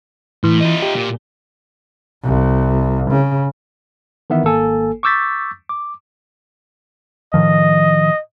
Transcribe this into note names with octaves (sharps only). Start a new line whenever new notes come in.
A2 E3
D#4 F4
G4
A#2
C2
C#3
D#3 E3 B3 A#4 E5
G#1 A#3 A4 G#5
C#6 D6 E6 G6 A6 B6
D6
A2 D#3 F3 D#5